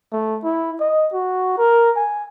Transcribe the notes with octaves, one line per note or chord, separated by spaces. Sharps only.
A3
E4
D#5
F#4
A#4
G#5